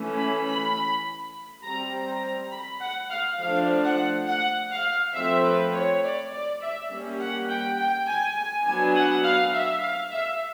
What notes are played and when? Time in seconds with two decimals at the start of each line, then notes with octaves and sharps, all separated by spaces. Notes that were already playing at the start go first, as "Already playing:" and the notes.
Already playing: E3 A3 C#4
0.18 B5
0.46 B5
1.63 G3 C4 A#5
2.07 A#5
2.51 B5
2.80 F#5
3.10 F5
3.39 F3 A3 D4 F5
3.84 F#5
4.27 F#5
4.71 F5
5.14 F3 A3 C4 E5
5.44 B4
5.73 C#5
6.02 D5
6.32 D5
6.61 E5
6.90 G3 A#3 C#4
7.19 F#5
7.49 G5
7.78 G5
8.07 G#5
8.36 G#5
8.66 F#3 B3 D4 G#5
8.95 F#5
9.24 F5
9.53 E5
9.82 F5
10.12 E5